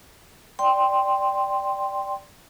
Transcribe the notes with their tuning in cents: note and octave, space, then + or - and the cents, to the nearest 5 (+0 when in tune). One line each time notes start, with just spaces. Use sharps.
D5 +0 G5 +0 C6 +0